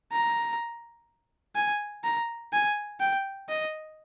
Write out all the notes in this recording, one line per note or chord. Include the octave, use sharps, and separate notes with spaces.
A#5
G#5
A#5
G#5
G5
D#5